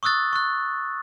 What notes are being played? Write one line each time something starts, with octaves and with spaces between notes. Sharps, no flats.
C#6 D#6 E6 F#6 A6
C#6 F#6